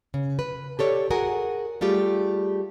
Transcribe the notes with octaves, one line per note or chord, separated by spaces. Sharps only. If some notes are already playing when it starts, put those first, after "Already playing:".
C#3
B4
G4 A4 C#5 D5
F#4 G#4 A#4 F#5 G#5
G3 A3 F4 G4 G#4